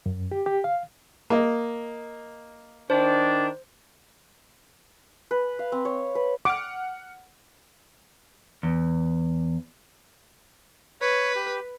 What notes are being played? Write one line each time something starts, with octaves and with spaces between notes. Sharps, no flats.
F#2
G4
G4
F5
A#3 D#5
D#3 D4 C5
B4
F5
C4
C#5
B4
F#5 D6 F6
E2
B4 C#5
G4